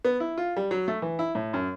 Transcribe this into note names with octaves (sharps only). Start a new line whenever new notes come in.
B3
E4
F4
G3
F#3
A3
E3
E4
A2
F#2